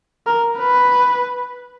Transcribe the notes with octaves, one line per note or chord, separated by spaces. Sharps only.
A#4
B4